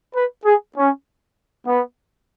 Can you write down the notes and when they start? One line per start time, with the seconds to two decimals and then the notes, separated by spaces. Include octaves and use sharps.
0.15 B4
0.45 G#4
0.76 C#4
1.66 B3